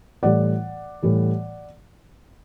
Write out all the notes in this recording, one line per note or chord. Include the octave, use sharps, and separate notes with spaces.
A2 E3 G3 D5 F#5
A2 E3 G3